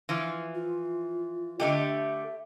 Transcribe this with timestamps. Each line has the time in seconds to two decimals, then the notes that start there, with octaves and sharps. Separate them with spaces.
0.09 E3 F3
0.54 F4
1.60 D3 A3 G4 D#5
1.79 E5